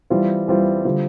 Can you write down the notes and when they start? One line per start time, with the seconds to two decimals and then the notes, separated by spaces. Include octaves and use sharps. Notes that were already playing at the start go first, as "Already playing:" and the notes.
0.10 E3 G3 C4 F4
0.48 E3 G3 C4 F4
0.85 D3 G3 C4 F4